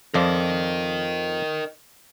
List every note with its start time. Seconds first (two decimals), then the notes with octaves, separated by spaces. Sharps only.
0.14 F2 F3 A#4 D5 D#5